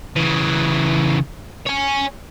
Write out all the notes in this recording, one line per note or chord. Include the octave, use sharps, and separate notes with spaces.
C#3 E3
C#5 G#5